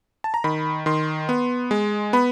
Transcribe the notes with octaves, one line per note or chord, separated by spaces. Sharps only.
A5
A#5
D#3 B5
D#3 C6
B3
G#3
B3 B5